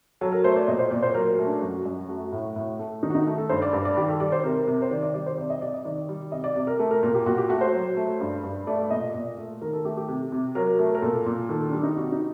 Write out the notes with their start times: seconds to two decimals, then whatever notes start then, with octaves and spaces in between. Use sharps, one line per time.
0.21 F#3 A4
0.32 A#4
0.44 A3 C5
0.56 D5
0.68 A#2 D#5
0.79 C5
0.91 A#2 D5
1.03 C5
1.15 F#3 A#4
1.38 A3
1.46 D4
1.62 F#2 F#4
1.85 F#2
2.09 A3 F#4
2.32 A2
2.56 A2
2.79 A3
3.03 D#3 D#4
3.10 F#4
3.15 D#4
3.27 A3
3.38 A4
3.49 G2 C5
3.62 D5
3.73 G2
3.85 D5
3.97 D#3 G4
4.08 A4
4.20 G3 D5
4.32 C5
4.44 C3 A#4
4.67 C3
4.82 C5
4.91 D#3 D5
5.03 D5
5.14 G3 D5
5.26 C5
5.38 C3 D5
5.50 D#5
5.62 C3 D5
5.74 D#5
5.85 D#3 D5
6.09 G3
6.32 C3 D#5
6.44 D5
6.55 C3 D5
6.67 A#4
6.79 A3 A4
6.91 A#4
7.03 A#2 A#4
7.14 G4
7.26 A#2 F#4
7.38 G4
7.49 A3 F#4
7.61 C5
7.73 F#3
7.97 A3
8.20 G2
8.43 G2
8.67 A3 D5
8.90 A#2 D#5
9.14 A#2 D5
9.38 A3 A4
9.62 D#3 A#4
9.73 A4
9.85 A3 G4
9.97 G4
10.08 C3
10.32 C3
10.55 F#3 A#4
10.79 A3
10.95 A#4
11.02 A#2 A4
11.26 A#2
11.49 D#3 A4
11.70 G3 D4
11.83 D#4
11.97 C3 F#4
12.12 D#4